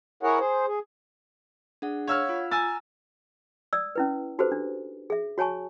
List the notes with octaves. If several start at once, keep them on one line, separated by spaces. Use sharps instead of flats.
E4 G#4 A#4 C#5 F#5
G#4 C5
G#4
D4 G#4 F#5
C#5 F5 F#5 E6 F6 G#6
F4
G#5 A#5 E6 A6
D5 D#6 E6
C#4 E4 B4
D#4 F#4 G4 A4 B4 C5
D4
G#4 E5
F#4 C#5 G#5 A5 C#6